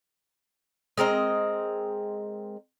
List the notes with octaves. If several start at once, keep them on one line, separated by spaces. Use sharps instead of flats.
G#3 C4 A#4 D#5